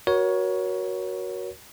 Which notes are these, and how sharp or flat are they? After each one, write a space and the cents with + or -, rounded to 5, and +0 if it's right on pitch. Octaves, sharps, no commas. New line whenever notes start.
F#4 +0 A#4 +35 C#5 +10